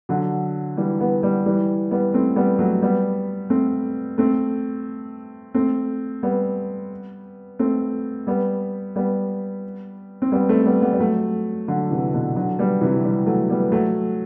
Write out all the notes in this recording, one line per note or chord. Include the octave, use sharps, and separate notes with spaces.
D3 F#3
E3 G3
G3 B3
G3 B3
E3 G3
G3 B3
A3 C4
G3 B3
F#3 A3
G3 B3
A3 C4
A3 C4
A3 C4
G3 B3
A3 C4
G3 B3
G3 B3
C4
G3 B3
A3 C4
G3 B3
G3 B3
G3
F#3 A3
D3 F#3
C3 E3
B2 D3
D3 F#3
G3 B3
C3 E3
E3 G3
F#3 A3
G3 B3
F#3 A3